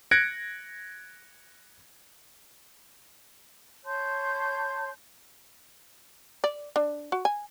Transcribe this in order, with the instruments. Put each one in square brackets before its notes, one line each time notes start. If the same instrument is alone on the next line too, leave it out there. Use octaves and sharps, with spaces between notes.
[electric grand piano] F#6 G#6 A#6 C#7 D7
[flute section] C#5 A5 C6 G6
[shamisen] D5
D4
F#4
G#5